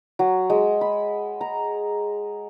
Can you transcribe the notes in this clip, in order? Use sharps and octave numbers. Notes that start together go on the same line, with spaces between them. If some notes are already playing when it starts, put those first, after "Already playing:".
F#3
G#3
B5
A#5